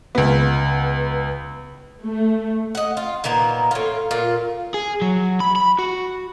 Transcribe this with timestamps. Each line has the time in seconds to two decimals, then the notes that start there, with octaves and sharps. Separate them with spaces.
0.15 C#2 B3
2.02 A3
2.75 D#5 F#5
2.97 F4
3.24 A#2 D#3 A#3 B3
3.71 A2 F4
4.11 A#2 F4
4.74 G#4
5.02 F#3
5.40 B5
5.56 B5
5.79 F#4